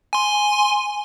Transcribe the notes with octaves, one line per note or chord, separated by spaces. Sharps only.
G#5 C6